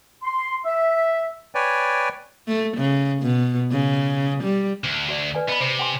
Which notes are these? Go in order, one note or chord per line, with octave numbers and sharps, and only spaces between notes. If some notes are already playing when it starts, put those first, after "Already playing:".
C6
E5
B4 C#5 D5 G5 G#5
A3
C#3
B2
C#3
G3
D2
F#4 D5
B4 D5 G#5
B3 D#5 B5
C3 C5
G5 G#5 C6